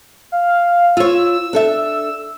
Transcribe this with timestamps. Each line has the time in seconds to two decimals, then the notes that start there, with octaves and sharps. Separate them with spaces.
0.32 F5
0.97 F4 C#5 E6
1.53 D4 A4 E5